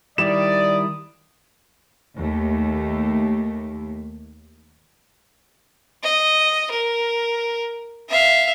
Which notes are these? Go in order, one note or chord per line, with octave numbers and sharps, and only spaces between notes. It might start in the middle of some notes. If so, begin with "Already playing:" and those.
D#3 G3 E4 D5 D#6 E7
D#2 A3
D#5
A#4
E5 F5